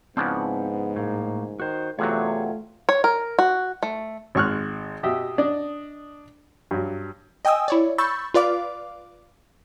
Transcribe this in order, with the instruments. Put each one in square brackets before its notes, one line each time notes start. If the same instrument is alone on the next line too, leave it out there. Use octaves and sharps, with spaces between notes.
[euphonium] G#2 [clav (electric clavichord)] C#3 F3 D4 [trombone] B3 [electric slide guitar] C4 E4 F#5
[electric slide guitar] A2 [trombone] A#3
[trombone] D#3 [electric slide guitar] F#4 C5
[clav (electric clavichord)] E2 C3 F#3 [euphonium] A3 [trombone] F4 [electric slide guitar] G#4 C#5
[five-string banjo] C#5
A#4
F#4
A3
[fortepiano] G#1 G#3 C#6 F6 F#6
B2 G4 D#5 E5
D4 D5 D#5
G2 F#3
[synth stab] D#5 G5 G#5 D#6 E6
E4 C#5 D5
B5 C#6 E6 G6 A6
F4 B4 D5 F5 D6